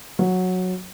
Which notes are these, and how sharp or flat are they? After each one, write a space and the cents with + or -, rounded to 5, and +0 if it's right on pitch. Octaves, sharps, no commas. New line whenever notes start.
F#3 -10